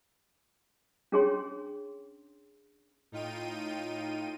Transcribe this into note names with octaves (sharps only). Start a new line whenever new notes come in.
C#4 D4 G#4 C#5 G5 C6
A2 D#4 F4 G5 D#7